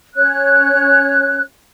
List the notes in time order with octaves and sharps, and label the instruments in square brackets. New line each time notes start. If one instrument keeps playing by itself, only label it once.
[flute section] C#4 C#5 F#6